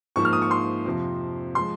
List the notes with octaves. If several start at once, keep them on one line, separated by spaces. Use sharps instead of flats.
G#2 F3 A#3 C#6
F6
D#6
C#6
C6
F2 C3 F3
F3 G#3 C6